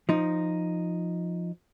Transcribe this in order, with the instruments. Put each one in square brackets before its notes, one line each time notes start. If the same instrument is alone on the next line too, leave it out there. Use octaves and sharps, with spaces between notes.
[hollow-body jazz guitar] F3 D#4